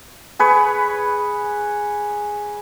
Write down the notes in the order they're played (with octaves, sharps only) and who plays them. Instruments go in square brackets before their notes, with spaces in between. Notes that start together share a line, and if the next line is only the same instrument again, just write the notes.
[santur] G#4 B4 C#5